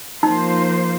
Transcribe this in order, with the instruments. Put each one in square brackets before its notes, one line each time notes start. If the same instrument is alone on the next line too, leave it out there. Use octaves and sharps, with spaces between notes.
[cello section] F3 A#3 F4 C5 [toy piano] D#4